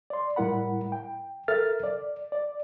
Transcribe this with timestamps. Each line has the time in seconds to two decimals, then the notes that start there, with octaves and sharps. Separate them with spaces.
0.10 D5 C6
0.36 A2 G3 E4 A#4 F#5 B5
0.92 G5
1.48 A4 A#4 E5 F6 A6
1.83 D5
2.32 D5